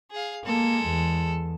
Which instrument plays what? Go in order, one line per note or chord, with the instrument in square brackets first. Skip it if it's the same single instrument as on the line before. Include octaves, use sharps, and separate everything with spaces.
[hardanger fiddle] G#4 F5
[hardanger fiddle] G#3 A4 [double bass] A#3
[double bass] E2